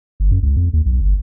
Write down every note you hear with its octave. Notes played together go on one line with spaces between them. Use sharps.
G1
F#2
C#2
F2
D#2
B1
G1